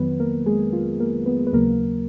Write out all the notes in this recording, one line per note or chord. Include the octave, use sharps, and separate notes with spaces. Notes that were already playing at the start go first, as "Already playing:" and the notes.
Already playing: F2 D#3 F#3 B3 B4
A#3 A#4
G#3 G#4
F4
A#3 A#4
B3 B4
B4
D#2 C#3 F#3 A#3 A#4